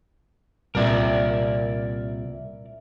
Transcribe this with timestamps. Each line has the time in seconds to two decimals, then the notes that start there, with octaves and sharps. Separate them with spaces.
0.75 C2 A#2 A#4 D5 E5